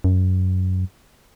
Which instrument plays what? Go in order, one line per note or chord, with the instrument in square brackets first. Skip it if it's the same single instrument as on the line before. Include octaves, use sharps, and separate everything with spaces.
[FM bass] F#2